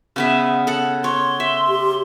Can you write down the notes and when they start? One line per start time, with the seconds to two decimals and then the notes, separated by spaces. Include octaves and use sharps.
0.16 C#3 B3 E5
0.67 A4 F#5
1.04 C#5 C6
1.40 E5
1.69 G4